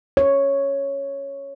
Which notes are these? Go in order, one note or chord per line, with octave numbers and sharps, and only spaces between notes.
C#5